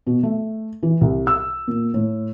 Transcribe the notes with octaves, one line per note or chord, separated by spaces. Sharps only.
B2
A3
E3
C2
E6
A#2
A2